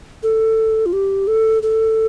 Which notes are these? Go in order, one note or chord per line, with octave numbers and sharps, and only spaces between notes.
A4
F4
G4
A4
A4